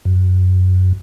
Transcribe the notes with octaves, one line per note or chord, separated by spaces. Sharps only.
F#2